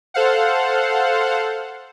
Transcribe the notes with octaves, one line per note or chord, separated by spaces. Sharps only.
A4 C5 F5 F#5